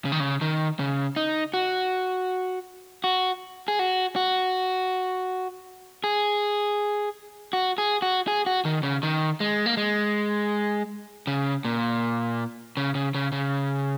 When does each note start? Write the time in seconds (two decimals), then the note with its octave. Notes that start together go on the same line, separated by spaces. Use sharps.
0.05 C#3
0.12 D#3
0.20 C#3
0.41 D#3
0.79 C#3
1.16 D#4
1.54 F#4
3.04 F#4
3.68 G#4
3.79 F#4
4.16 F#4
6.04 G#4
7.53 F#4
7.78 G#4
8.02 F#4
8.28 G#4
8.46 F#4
8.65 D#3
8.83 C#3
9.03 D#3
9.40 G#3
9.66 A#3
9.77 G#3
11.27 C#3
11.65 A#2
12.77 C#3
12.95 C#3
13.15 C#3
13.32 C#3